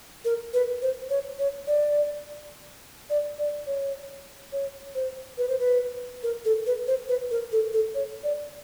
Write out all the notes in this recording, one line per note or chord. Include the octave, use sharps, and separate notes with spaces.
A#4
B4
C5
C#5
C#5
D5
D5
D5
C#5
C#5
C5
B4
C5
B4
A#4
A4
B4
C5
B4
A#4
A4
A4
C#5
D5